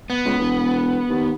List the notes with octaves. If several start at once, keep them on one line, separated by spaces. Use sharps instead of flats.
B3
C#2
E1
D#2